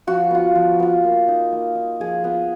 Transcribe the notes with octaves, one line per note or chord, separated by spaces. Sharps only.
F3 F#4
B3 F4
F3
B3 F4
A#3
D#4
A#3
D#4
F3 G#4
B3 F4